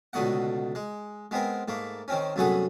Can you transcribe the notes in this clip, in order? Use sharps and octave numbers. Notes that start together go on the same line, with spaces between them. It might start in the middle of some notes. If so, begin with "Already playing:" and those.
C#2 B2 D3 A3 D#5 F#5
G#3
G#3 B3 C4 A#4
G#2 A3 A#3
D#3 C4 C#4
C2 F#2 A3 B3 G#4 F#5